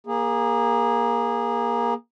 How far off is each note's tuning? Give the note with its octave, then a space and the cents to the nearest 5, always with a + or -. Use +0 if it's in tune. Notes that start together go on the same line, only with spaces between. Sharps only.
A#3 +15 G#4 -20